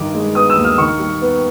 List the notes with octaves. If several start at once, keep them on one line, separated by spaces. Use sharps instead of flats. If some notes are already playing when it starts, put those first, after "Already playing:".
Already playing: G2 D#3 D6
G#3
B3 D#6
E6
D#2
F6
D#3 C#6
G3
B3